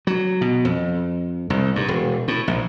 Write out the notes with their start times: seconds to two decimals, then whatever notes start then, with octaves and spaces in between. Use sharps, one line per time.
0.07 F#3
0.41 B2
0.65 F2
1.50 C2
1.76 G2
1.88 E1
2.28 A2
2.48 A#1